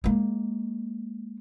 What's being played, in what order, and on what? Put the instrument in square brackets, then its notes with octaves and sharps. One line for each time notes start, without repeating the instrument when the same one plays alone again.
[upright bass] G#3 A#3